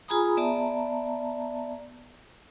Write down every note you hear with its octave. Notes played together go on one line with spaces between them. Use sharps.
F4 G#4 G#5 A#5 B5 D#6
B3 D5 E5 A5 A#5